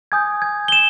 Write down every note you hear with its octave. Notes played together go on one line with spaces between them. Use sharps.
G#5 D#6 G6 G#6
G#6
G7
E7